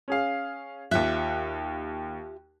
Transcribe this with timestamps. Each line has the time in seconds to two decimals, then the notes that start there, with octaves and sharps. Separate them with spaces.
0.08 C#4 G#4 F5
0.91 D#2 F4 G4 E5 F#6